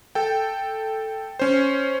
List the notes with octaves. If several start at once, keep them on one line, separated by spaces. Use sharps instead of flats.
A4 G5
C#4 C5